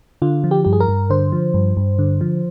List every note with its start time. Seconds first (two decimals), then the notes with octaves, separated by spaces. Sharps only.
0.22 D3 F4
0.44 F3
0.51 G4
0.64 G2 G4
0.73 G#4
0.80 A#4
0.88 G2
1.10 D3 C5
1.32 F3
1.54 G2
1.77 G2
1.99 D3
2.21 F3